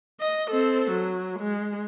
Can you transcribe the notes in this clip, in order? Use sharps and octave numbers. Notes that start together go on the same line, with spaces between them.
D#5
C4 A4
F#3
G#3